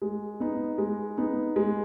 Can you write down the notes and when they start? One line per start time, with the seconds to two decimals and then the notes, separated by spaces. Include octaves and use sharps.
0.02 G#3
0.40 B3 D#4
0.78 G#3
1.17 B3 D#4
1.56 G#3